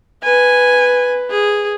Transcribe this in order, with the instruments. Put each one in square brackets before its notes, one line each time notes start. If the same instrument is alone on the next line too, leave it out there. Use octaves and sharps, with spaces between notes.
[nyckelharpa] B4 [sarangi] G#5
[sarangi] G#4